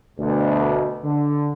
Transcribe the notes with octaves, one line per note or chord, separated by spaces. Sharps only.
D2 B2
D3